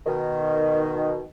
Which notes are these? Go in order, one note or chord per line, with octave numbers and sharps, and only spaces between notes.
B2 D#3